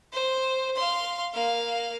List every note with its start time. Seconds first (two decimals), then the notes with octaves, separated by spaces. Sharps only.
0.13 C5
0.76 F5 C6
1.33 A#3 F5